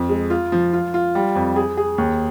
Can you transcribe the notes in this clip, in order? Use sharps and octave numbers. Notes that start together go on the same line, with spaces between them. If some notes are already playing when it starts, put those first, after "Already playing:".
Already playing: F2
G#3
F4
F3
F4
F4
G3
F2
G#4
G#4
D#2